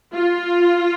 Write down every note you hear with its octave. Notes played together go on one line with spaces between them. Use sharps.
F4